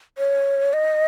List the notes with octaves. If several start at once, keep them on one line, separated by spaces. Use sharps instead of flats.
C#5
D#5